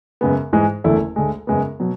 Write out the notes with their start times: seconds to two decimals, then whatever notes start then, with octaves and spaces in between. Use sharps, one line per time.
0.21 F#2 C#3 G#3 B3
0.53 G#2 E3 G#3
0.84 F#1 E2 D3 A3 E4
1.16 D2 D3 G#3
1.47 F#2 C#3 G#3 B3
1.80 B2 F#3